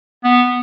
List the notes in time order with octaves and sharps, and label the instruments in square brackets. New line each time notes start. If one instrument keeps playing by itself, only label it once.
[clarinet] B3